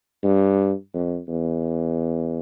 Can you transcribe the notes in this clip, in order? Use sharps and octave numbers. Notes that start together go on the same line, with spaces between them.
G2
F2
E2